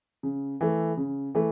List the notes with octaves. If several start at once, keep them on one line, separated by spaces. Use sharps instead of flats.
C#3
E3 A3
C#3
E3 A3